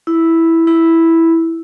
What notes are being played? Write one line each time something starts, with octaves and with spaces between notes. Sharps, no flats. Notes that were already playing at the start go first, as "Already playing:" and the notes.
E4
E4